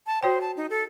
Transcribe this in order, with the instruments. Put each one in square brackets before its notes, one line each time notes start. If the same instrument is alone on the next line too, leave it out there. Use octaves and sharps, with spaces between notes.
[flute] A5
[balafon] F#4 C#5 G5 [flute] C5
[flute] A5
D#4
A4